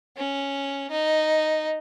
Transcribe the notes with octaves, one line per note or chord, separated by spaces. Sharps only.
C#4
D#4